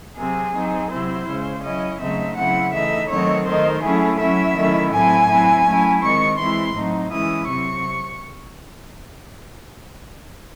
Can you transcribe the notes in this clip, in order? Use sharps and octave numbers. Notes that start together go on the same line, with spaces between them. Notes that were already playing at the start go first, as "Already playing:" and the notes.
C3 F#3 C4 G#4
F#3 C4 D#4
C3 F#3 C4 E4 C5
C#3 G#3 C#4
F#3 C#4 E4 D#5
C#3 F#3 A3 C4 D#4 E5
C#3 F#3 C4 E4 F#5
E3 A3 D#4 E5
D#3 F#3 A3 C4 D#4 C#5
D#3 A3 D#4 C5
F#3 A3 C#4 E4 G#4
F#3 C#4 E4 E5
D#3 F#3 A3 C#4 E4
A2 F#3 C4 E4 G#5
F#3 C4 E4
F#3 A3 C#4 E4
D#3 G#3 C4 C#6
E3 G#3 C4 E4 C6
A2 F#3 C4 D#4
E3 G#3 C#4 E4 D#6
C3 F#3 C4 C#6